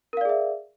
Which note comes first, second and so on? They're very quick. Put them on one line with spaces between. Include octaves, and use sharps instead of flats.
A#4 F5 D5 G#4 E5